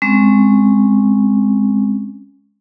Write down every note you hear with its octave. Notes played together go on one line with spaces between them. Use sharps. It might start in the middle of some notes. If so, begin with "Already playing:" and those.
G#3 C4 C#4